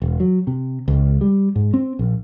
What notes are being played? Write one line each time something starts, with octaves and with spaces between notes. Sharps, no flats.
E1
F#3
C3
C#2
G3
G#2
C4
A#1